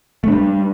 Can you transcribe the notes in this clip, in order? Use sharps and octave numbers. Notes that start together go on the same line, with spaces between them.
G3 A3 D4